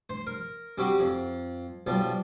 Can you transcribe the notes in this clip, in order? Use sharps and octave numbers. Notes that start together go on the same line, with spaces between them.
C5 C6
A#4
G3 C4 F#4 G4
F2
B1 F3 G3